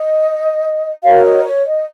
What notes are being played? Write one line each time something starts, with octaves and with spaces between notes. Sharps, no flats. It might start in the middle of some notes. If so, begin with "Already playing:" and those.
Already playing: D#5
F#4 A#4 C#5 F5
D#5
C#5
D#5